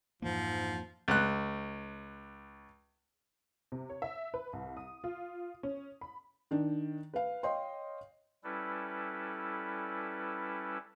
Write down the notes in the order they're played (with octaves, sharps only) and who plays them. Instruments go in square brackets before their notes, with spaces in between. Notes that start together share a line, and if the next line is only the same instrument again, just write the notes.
[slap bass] F2 E3 A#3 [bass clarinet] G#2 [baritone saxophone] F3
[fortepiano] C#2 F#6
[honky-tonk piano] C3
C#5
E5
B4
C2
D#6
F4
C#4
B5
[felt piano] D#3 D4
B4 F5
C#5 D#5 F5 G5 C6
[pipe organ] G3 C#4 E4 A4 B4